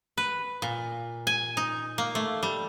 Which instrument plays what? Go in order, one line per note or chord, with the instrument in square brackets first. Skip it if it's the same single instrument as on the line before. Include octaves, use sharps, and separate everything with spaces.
[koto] B4
A#2
G#5
D#4
A#3
A3
G3